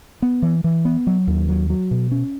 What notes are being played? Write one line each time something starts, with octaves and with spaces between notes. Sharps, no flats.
B3
E3
E3
B3
F#3
D#2
F#3
F#3
B2
C#4